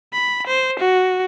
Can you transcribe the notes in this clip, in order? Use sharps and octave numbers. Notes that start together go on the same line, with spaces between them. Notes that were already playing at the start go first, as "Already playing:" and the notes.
B5
C5
F#4